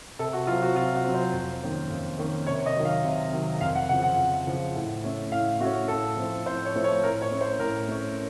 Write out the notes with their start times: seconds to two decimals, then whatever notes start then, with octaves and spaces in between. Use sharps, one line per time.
0.19 C3 A4
0.33 F#4
0.47 F#3 C4 F4
0.62 F#4
0.76 C3 F4
0.95 F#4
1.04 F#3 C4
1.14 C5
1.33 F2
1.62 D#3 A#3 C#4
1.90 F2
2.18 D#3 A#3 C#4
2.47 C3 C#5
2.66 D#5
2.75 D#3 F#3
2.85 F5
3.04 C3
3.32 D#3 F#3
3.61 F2 F5
3.75 F#5
3.89 C#3 F3 F#5
4.03 F#5
4.18 F2
4.47 C#3 F3
4.75 A2
5.04 A3 C#4
5.32 A2 F5
5.60 A3 F#4
5.65 C#4
5.88 A2 A4
6.17 F3 A3 C4
6.46 A2 C5
6.65 C#5
6.74 F3 A3 C4
6.84 C#5
7.03 A2 A#4
7.22 C#5
7.31 A3 C#4
7.41 C5
7.59 A2 A#4
7.88 A3 C#4